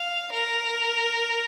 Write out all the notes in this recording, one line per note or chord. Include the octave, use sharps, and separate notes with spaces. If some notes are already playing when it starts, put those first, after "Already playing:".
Already playing: F5
A#4